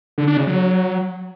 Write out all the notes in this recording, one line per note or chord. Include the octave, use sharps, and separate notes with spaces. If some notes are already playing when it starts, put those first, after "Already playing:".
D3
D4
C#3
F#3